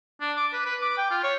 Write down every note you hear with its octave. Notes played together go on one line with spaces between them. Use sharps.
D4
D6
B4
B4
D6
G5
F4
C#5